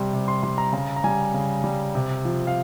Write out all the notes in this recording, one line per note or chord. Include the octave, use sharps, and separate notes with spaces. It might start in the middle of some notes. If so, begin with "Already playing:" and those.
Already playing: C3 G3 C6
C3
C6
G3 C6
A#5
C#3 A#5
A#5
G3 G#5
C#3
G3
C3
F3
F5